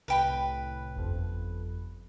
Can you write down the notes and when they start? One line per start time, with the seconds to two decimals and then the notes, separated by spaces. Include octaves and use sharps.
0.08 C2 A2 B4 G5 B5
0.96 G1 F2